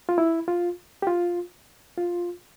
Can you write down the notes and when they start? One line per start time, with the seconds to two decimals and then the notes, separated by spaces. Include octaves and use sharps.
0.09 F4
0.18 E4
0.48 F4
1.02 G4
1.07 F4
1.98 F4